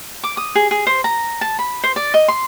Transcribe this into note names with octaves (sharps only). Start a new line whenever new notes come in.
D6
D#6
G#4
G#4
C5
A#5
A5
B5
C5
D5
D#5
C6